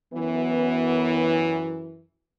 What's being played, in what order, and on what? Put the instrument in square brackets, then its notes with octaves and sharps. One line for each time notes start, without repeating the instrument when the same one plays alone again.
[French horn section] F#2 E3 [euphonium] B3